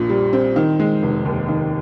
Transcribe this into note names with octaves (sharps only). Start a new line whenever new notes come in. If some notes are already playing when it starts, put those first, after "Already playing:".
Already playing: A#1 A#2
G3
C4
D#3
G#3
F1
D#2
D#3